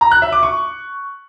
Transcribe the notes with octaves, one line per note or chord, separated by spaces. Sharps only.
A#5
F#6
E5
D6
C#6